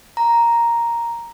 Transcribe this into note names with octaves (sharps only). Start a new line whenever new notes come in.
A#5